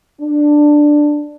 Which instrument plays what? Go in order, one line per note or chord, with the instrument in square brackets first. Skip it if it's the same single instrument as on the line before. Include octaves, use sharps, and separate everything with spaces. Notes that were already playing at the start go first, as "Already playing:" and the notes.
[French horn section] D4